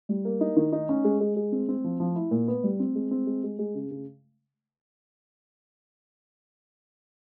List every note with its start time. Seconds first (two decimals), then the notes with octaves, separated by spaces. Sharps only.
0.09 G3
0.25 A#3
0.41 D#4
0.57 D#3
0.72 D#4
0.89 C#4
1.04 G#3
1.20 G#3
1.36 G#3
1.52 C4
1.68 C4
1.84 F3
2.00 F3
2.15 E4
2.31 A#2
2.48 B3
2.64 G3
2.80 C4
2.95 G#3
3.11 C4
3.27 G#3
3.44 G#3
3.59 G#3
3.75 C#3
3.91 C#3